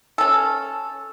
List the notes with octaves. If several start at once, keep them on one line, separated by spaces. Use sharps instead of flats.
C#4 A4